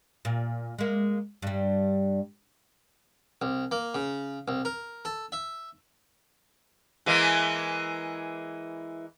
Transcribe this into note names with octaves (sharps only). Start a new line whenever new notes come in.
A#2
G#3 A#3
G2 G3
C2
A#3
C#3
C2
A#4
A4
E5
E3 G#3 A#3